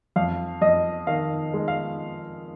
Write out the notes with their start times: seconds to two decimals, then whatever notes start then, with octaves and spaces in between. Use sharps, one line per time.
0.16 F2 F5
0.61 F2 D#5
1.07 D#3 F5
1.54 G#3
1.68 F5